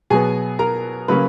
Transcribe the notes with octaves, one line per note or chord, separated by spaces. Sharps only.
B2 F#3 B3 G#4 G#5
A#4 A#5
C#3 F#3 A#3 C#4 B4 B5